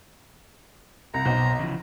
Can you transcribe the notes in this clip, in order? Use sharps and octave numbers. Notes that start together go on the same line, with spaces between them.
C2 A#5
B1 B2 C5
C#3 E3 F3